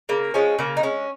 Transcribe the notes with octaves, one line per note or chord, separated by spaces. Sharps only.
C#3 A#3
F3 G#3 C#4
C#3 A#3
D#4
G#3 C#4